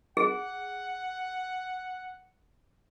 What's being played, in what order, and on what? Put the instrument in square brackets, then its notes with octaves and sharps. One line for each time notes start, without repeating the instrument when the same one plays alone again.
[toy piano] G#4 [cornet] F#5